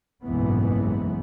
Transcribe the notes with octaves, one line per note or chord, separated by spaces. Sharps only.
F#1 B1 F2 G#2 E3 B3